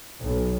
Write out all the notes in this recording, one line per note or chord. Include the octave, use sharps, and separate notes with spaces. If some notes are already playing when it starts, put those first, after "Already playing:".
B1